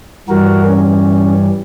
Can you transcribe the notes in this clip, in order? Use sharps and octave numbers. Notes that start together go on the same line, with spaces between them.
G2 E3 G3 F#4 A#4
C#4